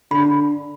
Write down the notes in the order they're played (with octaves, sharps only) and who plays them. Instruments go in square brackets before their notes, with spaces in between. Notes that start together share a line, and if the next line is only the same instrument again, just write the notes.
[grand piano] D3 [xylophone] B5